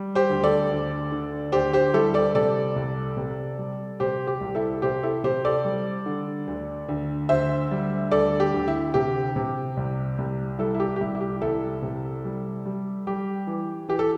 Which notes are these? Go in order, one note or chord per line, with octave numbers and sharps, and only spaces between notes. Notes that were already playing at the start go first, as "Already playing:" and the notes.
Already playing: G3
G4 C5
D2
A4 D5
D2
D3
D2 G4 C5
G4 C5
G3 E4 A4
A4 D5
C3 A4 D5
C2
C3
G3
C3 G4 C5
G4
C2
E4 A4
C3 G4 C5
E4 A4
C3 G4 C5
A4 D5
G3
D3
D2
D2
D2 C5 E5
G3
D2 A4 D5
G4
D2
E4
C3 G4
C3
C2
C2
G3 E4 A4
E4
G4
G4
C2 E4
E4
G4
C2 E4 A4
C3
G3
G3
G3 G4
E3
E3 G4
A4